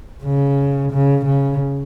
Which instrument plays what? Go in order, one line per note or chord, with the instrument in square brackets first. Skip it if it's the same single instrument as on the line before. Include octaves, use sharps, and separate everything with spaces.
[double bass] C#3
C#3
C#3